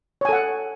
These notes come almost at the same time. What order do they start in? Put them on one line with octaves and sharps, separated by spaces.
C#5 G#5 A4 F#5